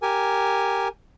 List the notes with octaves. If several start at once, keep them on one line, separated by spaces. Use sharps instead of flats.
G4 A#4 G#5